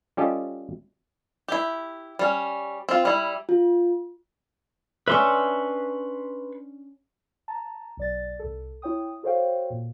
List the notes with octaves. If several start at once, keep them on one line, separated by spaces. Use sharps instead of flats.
G3 C#4 F4 G4 A4 D#5
E4 G4
G3 C#4
C4 F4
G3 E4
F4
C#4 D4 B4 E5 C6 C#6
A5 A#5
B1 D5 A6
C2 A4
E4 C#5 G5 D#6
F#4 A4 C5 C#5 F5 G5
A#2